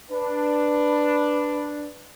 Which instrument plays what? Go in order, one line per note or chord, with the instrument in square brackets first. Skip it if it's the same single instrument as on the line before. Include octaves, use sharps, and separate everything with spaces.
[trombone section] D4 [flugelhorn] B4